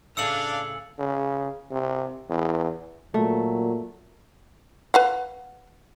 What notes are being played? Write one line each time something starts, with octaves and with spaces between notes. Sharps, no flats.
A2 C#3 D4 G#4 F5 E6 C#7 F#7
C#3
C3
E2
A#2 F#3 A3
B4 F5 F#5